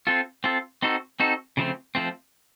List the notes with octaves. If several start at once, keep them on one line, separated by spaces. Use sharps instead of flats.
C4 F4 A4
C4 F4 A4
C4 D#4 F#4 A4
C4 D#4 F#4 A4
C#3 F3 A3 C4
F3 A3 C4